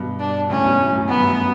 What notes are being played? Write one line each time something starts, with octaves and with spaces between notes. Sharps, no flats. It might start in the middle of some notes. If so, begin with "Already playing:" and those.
Already playing: G2 B2
D4
A2 C#3 C#4
G2 B2
F#2 A2
F#2
A2 B3
G2
F#2